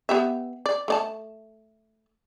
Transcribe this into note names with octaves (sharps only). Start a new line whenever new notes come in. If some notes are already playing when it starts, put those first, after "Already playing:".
B3 G4 E5
D5
A3 D5 A5